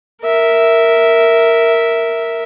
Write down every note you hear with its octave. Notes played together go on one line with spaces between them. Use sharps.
A#4 E5